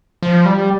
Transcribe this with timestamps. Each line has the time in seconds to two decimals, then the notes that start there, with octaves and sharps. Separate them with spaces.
0.23 F3
0.45 G3